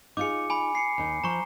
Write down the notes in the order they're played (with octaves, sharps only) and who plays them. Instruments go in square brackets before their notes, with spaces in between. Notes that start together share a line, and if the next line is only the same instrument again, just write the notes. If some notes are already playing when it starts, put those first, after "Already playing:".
[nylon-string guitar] D#4 F4 G#4 [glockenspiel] D6 C#7
[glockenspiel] G#5 B5
C7 C#7
[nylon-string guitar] D#2 D#4
[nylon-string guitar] F3 [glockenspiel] A#5 C#6